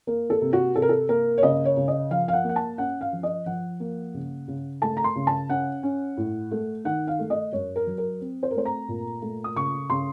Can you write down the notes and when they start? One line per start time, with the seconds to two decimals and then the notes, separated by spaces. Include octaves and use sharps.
0.07 A#3 A#4
0.30 A4
0.41 C3
0.53 F#4
0.75 C3 A4
0.82 A#4
0.89 A4
1.09 A#3 A#4
1.38 C#5
1.43 C#3 D#5
1.65 C#5
1.77 C#3
1.88 D#5
2.10 F3 F5
2.28 F5
2.33 F#5
2.44 A#3 F#5
2.56 A5
2.78 C#4 F#5
3.01 F5
3.13 F3
3.23 D#5
3.46 F3 F#5
3.80 A#3
4.14 C#3
4.48 C#3
4.82 A3 A5
4.97 A#5
5.04 C6
5.16 C#3
5.27 A5
5.49 C#4 F#5
5.83 C#4
6.17 A2
6.51 A3
6.84 D#3 F#5
7.08 F5
7.19 A3
7.30 D#5
7.52 F#2 C#5
7.76 A#4
7.87 F#3
7.98 A#4
8.21 C4
8.43 C5
8.51 A#4
8.55 A3 C5
8.65 A#5
8.88 A#2
9.22 A3
9.44 D#6
9.56 C#3 C#6
9.90 C#3 C6